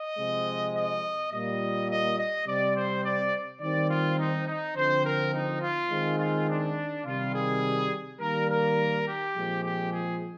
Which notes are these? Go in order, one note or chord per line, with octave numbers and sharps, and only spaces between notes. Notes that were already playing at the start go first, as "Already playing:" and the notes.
Already playing: D#5
C3 F3 G#3 C4
D#5
A#2 G3 A#3 D#5
D#5
D#5
C3 G3 C4 D5
C5
D5
D#3 G3 C4 D5
F4
D#4
D#4
D3 F3 C4 C5
A#4
D#4
F4
D#3 G#3 C4
F4
D4
C3 D#3 G3 F4
G#4
D#3 G3 A#3 A#4
A#4
G4
A#2 F3 G#3 C4
G4
G#4